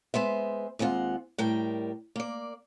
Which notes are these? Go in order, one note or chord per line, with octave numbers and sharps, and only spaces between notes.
G#3 B3 C5 E5
D#2 G#3 C4 F4 F#5
A2 G3 A#4 G5
A#3 D5